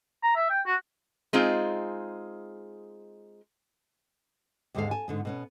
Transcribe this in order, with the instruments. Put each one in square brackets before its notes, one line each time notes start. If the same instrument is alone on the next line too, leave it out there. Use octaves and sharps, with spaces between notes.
[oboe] A#5
E5
G5
F#4
[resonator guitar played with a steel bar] G#3 C4 D#4 F4 G#4
[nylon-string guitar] D#2 G#2 D3 G#3 A4 F5
G#5 A5
G#2 D3 B3
B2 B3 C#4